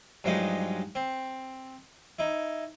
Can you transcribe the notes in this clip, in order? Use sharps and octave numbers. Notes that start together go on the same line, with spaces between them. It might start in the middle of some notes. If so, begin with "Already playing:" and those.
G2 F3 F#3 G#3 D#4
C4
D#4 E4